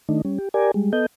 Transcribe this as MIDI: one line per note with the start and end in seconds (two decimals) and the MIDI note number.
0.09 0.22 51
0.09 0.22 57
0.09 0.22 62
0.09 0.22 63
0.25 0.38 55
0.25 0.38 61
0.38 0.49 67
0.54 0.71 67
0.54 0.71 70
0.54 0.71 74
0.54 0.71 80
0.74 0.92 55
0.74 0.92 56
0.93 1.06 59
0.93 1.06 69
0.93 1.06 75
0.93 1.06 91